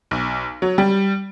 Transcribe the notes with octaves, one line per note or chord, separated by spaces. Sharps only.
B1
F#3
G3